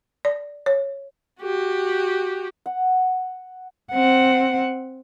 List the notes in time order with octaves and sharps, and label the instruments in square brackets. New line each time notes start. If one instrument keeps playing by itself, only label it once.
[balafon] D5
C#5
[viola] F#4 G4
[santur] F#5
[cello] C4 F#5